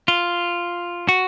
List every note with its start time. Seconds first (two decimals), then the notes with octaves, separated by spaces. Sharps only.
0.08 F4
1.09 F#4